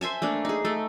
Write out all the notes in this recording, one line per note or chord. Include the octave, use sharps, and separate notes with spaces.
C5 E5 G#5 A5
A3 A#3 D4
D#4 G#4
A3